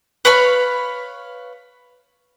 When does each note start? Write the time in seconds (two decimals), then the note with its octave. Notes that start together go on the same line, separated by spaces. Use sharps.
0.25 B4 C#5 F5 B5